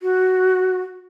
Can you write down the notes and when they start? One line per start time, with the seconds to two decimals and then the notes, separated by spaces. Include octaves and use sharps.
0.02 F#4